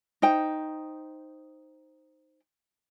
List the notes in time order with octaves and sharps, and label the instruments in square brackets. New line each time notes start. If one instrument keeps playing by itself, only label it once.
[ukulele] D#4 C5 G5